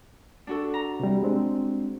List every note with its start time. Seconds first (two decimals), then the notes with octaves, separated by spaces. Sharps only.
0.47 D4 F#4 A4
0.74 A#5
1.00 C3 G3
1.23 G#3 C4 D4